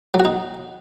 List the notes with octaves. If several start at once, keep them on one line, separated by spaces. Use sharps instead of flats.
F#3
F#4
D#4